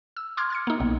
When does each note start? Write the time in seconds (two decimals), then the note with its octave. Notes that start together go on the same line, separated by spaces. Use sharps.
0.17 E6
0.37 C6 D6 F6 G#6
0.50 F6 G#6 C#7
0.67 A#3 D#4
0.80 B1